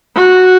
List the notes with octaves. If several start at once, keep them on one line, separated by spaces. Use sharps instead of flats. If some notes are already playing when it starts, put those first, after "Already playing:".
F#4